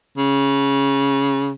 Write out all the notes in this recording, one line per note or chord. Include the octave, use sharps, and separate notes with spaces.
C#3